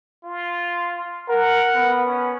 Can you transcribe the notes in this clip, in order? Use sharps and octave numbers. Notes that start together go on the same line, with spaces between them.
F4
A#4 F#5
B3
C#4